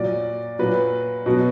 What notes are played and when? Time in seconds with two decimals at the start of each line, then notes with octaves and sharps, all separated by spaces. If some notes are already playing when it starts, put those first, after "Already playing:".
Already playing: A#2 F#3 D5
0.59 A#2 F#3 B4
1.26 B2 F#3